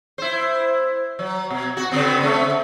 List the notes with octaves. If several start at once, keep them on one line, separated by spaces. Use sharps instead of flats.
E4 C5
F#3
B2
F#4
C#3 B3 C4
C#3 A3